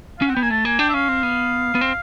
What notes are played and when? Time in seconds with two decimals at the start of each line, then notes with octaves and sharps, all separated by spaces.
0.19 F5
0.22 C#4
0.27 C4 F#5
0.34 B3 G5
0.42 A#3 G#5
0.50 A3 A5
0.65 A#3 G#5
0.79 D4 G5
0.89 E5
0.94 C#4 F5
1.08 C4
1.23 B3
1.75 B3
1.81 C4